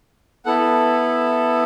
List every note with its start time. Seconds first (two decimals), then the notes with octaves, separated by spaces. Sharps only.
0.45 B3 E4 A4 F#5